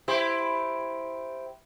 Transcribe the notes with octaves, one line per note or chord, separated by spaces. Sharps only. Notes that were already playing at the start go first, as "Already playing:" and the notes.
E4 G4 C5